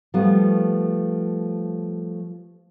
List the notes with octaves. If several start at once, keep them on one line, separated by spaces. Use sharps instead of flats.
F3 G3 A3 B3